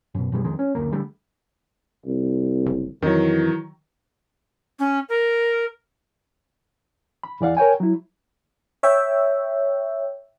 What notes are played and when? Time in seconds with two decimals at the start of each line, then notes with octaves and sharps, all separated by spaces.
0.15 F#2 B2
0.32 F#2 B2 G3 G#3
0.44 F2 D#3 G#3
0.59 C#4
0.75 F#1 D2 A#3
0.91 D3 G3 A3
2.05 C2
2.66 F#1
3.02 F2 D#3 E3 F#3
4.79 C#4
5.09 A#4
7.23 B5
7.41 E2 E3 D5 F5 F#5
7.57 A#4 C#5 G5 G#5
7.80 F#3 E4
8.83 C#5 E5 G5